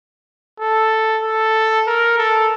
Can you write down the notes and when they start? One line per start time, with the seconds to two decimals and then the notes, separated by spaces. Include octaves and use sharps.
0.60 A4
1.23 A4
1.87 A#4
2.19 A4